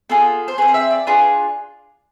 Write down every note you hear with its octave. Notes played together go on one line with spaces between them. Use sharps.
B3 F4 G#4 A4
C5
C4 G#4 B4
F5
E5
D5
D4 F4 G#4 B4